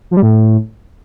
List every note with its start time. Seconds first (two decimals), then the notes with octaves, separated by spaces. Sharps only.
0.11 F3
0.17 G3
0.23 A2